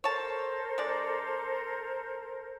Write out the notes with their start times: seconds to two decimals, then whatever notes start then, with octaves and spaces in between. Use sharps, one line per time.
0.04 A4 A#4 C5 C#5 A5
0.78 G#3 D4 D5